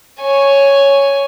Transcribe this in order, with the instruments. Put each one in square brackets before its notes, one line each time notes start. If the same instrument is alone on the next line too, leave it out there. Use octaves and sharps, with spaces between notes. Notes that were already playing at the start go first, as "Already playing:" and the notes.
[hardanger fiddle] C#5 G#5